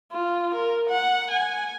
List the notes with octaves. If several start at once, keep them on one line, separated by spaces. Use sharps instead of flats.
F4
A#4
F#5
G#5